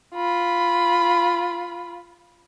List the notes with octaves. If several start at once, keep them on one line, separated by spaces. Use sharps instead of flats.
F4 B5